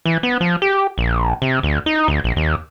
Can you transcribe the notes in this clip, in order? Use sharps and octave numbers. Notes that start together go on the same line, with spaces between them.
E3
B3
F3
G4
A#1
C3
D2
D#4
D2
A#1
D#2